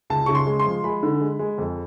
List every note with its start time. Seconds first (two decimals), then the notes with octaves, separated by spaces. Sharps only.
0.10 C#2 A5
0.26 C#3 C#6
0.35 C6
0.47 G#3
0.59 C6
0.66 F3
0.84 G#3 B5
1.03 D3
1.21 G#3
1.39 G#3
1.58 F2